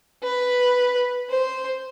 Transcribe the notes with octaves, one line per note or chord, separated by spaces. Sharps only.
B4
C5